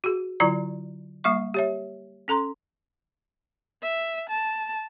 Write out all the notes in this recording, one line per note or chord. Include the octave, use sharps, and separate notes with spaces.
F#4 G#4
D3 F#3 E4 F4 D5 A#5
G3 A#3 E5 C#6
G4 C#5 E5
C#4 A4 A#5 C6
E5
A5